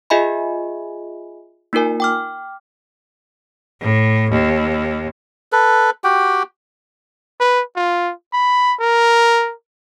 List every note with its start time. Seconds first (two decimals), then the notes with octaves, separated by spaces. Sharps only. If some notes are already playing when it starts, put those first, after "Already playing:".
0.10 F4 G#4 D#5 E5 G#5 B5
1.73 A#3 D#4 F4 A#4 G#5
2.00 G5 D6 F6
3.81 A2
4.31 D#2
5.52 A4 B4
6.04 F#4 G4 G5
7.40 B4
7.76 F4
8.33 B5
8.80 A#4